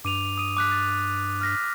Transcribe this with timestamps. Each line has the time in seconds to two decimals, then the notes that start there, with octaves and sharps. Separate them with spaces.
0.05 G2 D6 D#7 F7
0.37 D#6 D#7
0.57 D6 F#6 B6
0.71 A6
1.41 F6 A#6 B6